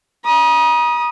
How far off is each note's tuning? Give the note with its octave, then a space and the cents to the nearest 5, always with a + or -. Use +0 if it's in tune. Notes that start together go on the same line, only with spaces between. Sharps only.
A#5 +45 D#6 +0